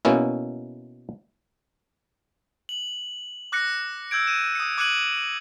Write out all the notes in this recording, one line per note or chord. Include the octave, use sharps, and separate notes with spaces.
B2 A#3 B3 C#4 E4
F#7
D6 F#6 A#6 C#7
E6 G6 G#6 D7
D#7 E7
D#6 C#7
D6 F#6 G#6 C#7 D#7 F#7